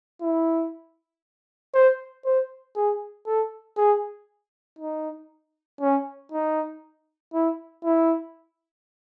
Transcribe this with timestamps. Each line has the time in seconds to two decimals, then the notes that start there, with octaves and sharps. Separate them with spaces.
0.21 E4
1.74 C5
2.25 C5
2.76 G#4
3.27 A4
3.77 G#4
4.79 D#4
5.81 C#4
6.32 D#4
7.33 E4
7.84 E4